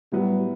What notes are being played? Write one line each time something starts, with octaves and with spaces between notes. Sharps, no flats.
A2 F#3 G3 B3